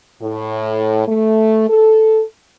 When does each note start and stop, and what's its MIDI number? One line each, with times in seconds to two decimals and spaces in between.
0.22 1.07 45
1.08 1.69 57
1.69 2.23 69